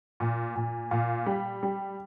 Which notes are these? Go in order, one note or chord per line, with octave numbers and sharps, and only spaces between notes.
A#2
A#2
A#2 F5
G3
G3